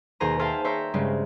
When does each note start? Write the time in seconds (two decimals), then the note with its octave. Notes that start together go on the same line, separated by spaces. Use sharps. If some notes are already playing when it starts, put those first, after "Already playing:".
0.20 D#2 B2 G#4 C5 A#5 D#7
0.39 G#4 C5 E5 F5 G5 A5
0.64 C5 C#5 E5 G5 A#5
0.94 G2 C#3 G#3 C4